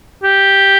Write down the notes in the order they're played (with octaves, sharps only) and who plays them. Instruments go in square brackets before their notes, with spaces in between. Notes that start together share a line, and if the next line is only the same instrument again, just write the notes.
[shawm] G4